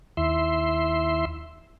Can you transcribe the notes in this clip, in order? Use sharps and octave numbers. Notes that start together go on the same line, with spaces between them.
D#2 E4 E5 C6